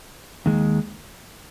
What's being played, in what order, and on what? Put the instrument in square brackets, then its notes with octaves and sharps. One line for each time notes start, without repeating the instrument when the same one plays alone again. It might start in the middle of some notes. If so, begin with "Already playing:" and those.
[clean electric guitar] D#2 D#3 G#3